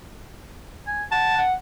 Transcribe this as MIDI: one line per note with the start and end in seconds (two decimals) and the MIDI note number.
0.87 1.04 80
1.12 1.36 78
1.12 1.42 81
1.37 1.53 78